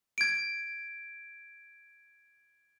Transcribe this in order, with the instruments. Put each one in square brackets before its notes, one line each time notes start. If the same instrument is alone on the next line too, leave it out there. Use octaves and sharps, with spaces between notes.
[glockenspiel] G#6 D7